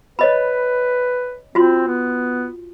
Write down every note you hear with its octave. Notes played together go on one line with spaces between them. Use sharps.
B4 C#5 D#5 B5
C4 F4 F#4 C6
B3